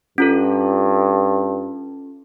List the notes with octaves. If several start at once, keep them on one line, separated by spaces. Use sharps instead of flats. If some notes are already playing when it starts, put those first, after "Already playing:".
G2 C#4 F4 A4